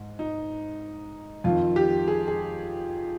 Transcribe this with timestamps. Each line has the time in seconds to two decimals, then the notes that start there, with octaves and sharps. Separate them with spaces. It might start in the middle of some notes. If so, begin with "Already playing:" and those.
Already playing: G#2
0.19 D#4
1.44 F2 D#3 F4
1.76 G4
2.08 G#4
2.28 G#4